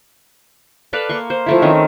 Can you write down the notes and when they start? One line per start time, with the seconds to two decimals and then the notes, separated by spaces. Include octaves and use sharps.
0.93 A4 B4 D5 F5
1.09 A#3 C6 C#6
1.30 C5
1.46 F3 A3 E4
1.62 D#3 C4 C#4